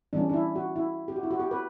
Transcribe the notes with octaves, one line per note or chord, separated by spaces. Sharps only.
E3 G3 C#4 D4
D4
E4
F#4
E4
G4
F#4
E4
F#4
G4
B4